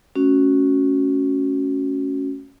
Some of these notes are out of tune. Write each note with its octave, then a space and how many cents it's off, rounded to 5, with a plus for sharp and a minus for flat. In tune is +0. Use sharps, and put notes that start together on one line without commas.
A3 -5 C#4 +0 F#4 +0